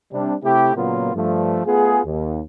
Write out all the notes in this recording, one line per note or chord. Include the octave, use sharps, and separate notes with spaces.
C3 G3 D4
C3 A3 E4 G4
A#2 C#3 F#3 A#3 B3 F4
G2 F3 A3
A3 B3 F4 G#4
D#2